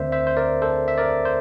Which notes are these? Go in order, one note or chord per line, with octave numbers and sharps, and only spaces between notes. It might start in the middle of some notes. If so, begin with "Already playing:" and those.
Already playing: D2 D3 A3 C4 A#4 C5 D5 E5
C5 E5
C5
A#4 D5
A4 C5
E5
A#4 D5
C5